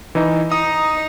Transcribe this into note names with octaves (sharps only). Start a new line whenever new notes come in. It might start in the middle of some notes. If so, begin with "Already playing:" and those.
E3 D#4
D#4 D#6